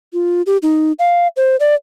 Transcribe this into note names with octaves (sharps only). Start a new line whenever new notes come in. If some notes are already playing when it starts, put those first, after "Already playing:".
F4
G4
D#4
F5
C5
D5